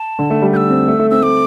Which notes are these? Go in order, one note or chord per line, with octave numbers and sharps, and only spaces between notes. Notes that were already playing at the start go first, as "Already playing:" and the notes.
Already playing: A5
D3
A3
G3
A3 E6 G6
C4
A3
A3
C4 E6
A3 D6